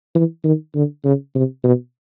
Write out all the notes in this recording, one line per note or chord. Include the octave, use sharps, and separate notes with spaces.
E3
D#3
D3
C#3
C3
B2